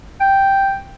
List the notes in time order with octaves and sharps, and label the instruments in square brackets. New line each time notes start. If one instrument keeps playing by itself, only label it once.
[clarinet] G5